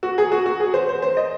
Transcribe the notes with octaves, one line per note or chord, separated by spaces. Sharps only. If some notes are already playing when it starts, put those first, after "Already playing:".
F#4
G#4
F#4
F#4
G#4
C5
C5
C5
D#5